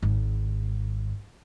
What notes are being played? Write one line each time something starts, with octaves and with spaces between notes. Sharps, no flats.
G#1 G#2